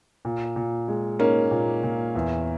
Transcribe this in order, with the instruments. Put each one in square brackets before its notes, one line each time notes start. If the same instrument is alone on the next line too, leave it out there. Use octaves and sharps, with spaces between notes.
[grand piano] A#2
A#2
G#3
[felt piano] A#3 C#4 [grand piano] D#4
[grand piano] A#2
A#2
E2